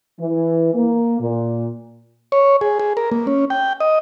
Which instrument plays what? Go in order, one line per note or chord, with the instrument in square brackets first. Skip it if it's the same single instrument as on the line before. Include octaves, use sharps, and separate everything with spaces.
[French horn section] E3
A#3
A#2
[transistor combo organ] C#5
G#4
G#4
A#4
A#3
C#4
G5
D#5